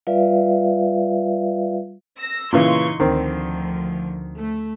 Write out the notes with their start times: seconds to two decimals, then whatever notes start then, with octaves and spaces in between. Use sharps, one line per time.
0.07 G3 F4 B4 D5 E5 F5
2.18 E6 A#6
2.52 A#2 C#3 E3 D#4 C6 C#6
3.00 D2 D3 D#3 F3 C4
4.37 A3